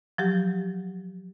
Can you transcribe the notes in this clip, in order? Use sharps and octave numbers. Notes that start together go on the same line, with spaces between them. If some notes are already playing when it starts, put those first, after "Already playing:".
F3 F#3 G4